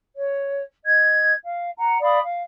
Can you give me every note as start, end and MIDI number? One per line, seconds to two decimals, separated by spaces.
0.17 0.61 73
0.84 1.32 75
0.84 1.32 92
1.43 1.70 77
1.76 2.00 78
1.76 2.00 82
2.00 2.18 74
2.00 2.18 77
2.00 2.18 83
2.00 2.18 87
2.24 2.42 77